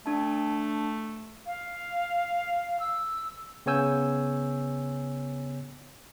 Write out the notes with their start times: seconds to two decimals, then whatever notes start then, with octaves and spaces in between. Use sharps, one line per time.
0.06 A3 D4 A5
1.46 F5
2.80 E6
3.66 C#3 B3 C#5 G#5 E6 G6